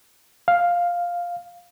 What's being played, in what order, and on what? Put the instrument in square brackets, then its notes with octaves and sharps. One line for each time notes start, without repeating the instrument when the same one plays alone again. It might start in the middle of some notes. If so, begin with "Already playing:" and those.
[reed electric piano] F5